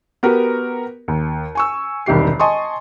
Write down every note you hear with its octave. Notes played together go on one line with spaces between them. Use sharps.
B3 F#4 G4 A#4
D#2
G#5 C#6 E6
E1 C2 D#3 G4 C7
D#5 G#5 A5 C6 C#6 D#6